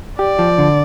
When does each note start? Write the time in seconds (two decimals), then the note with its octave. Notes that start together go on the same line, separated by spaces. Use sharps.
0.19 G4 D5
0.39 F3
0.58 D3